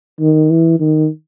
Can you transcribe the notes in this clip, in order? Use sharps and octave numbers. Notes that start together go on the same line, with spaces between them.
D#3
E3
D#3